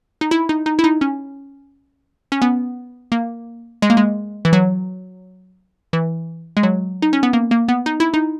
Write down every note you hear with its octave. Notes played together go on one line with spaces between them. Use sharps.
D#4
E4
D#4
D#4
E4
D#4
C#4
C#4
B3
A#3
G#3
A#3
G#3
E3
F#3
E3
G#3
F#3
D#4
C#4
B3
A#3
A#3
B3
D#4
E4
D#4